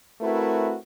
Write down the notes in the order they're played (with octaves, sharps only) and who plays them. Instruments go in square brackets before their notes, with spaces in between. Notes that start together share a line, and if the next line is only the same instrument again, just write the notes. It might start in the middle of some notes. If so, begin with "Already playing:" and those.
[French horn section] A3 C4 E4 F#4 A#4 B4